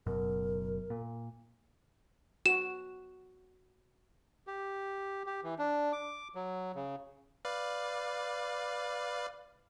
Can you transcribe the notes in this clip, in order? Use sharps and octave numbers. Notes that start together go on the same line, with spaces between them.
F#1 F#2 B2 A#4
A#2
F#4 E7
G4
G4
E3
D4
D6
F#3
C#3
B4 D5 F5